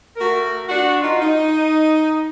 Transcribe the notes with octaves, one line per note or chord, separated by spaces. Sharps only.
A3 F#4 A#4
D4 F#4
D#4 F4
D#4